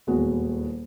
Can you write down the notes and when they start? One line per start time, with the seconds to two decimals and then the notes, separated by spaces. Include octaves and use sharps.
0.07 D#1 E2 G#3 F#4